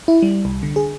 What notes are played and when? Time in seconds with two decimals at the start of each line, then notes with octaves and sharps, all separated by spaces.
0.08 E4
0.22 G3
0.45 C2
0.63 D3
0.76 G#4